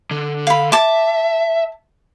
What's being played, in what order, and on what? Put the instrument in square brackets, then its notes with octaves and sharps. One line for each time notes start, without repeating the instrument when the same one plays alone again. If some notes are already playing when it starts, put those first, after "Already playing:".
[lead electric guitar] D3
[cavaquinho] F5 B5
[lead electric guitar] E5 [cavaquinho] A5 D6